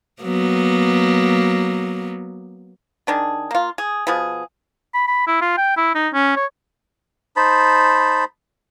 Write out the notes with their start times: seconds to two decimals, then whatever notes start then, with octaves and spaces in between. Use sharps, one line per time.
0.22 F#3 A#3 B3
3.07 D#3 D4 G#4
3.51 A#3 F4
3.78 G#4
4.07 B2 F3 B3 G#4
4.94 B5
5.08 B5
5.27 E4
5.42 F4
5.58 G5
5.77 E4
5.95 D#4
6.13 C#4
6.36 C#5
7.36 D#4 C5 A5 B5